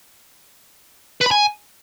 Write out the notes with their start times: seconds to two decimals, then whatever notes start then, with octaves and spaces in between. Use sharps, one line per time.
1.21 B4
1.26 B5
1.31 G#5